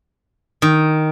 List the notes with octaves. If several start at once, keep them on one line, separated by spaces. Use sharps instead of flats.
D#3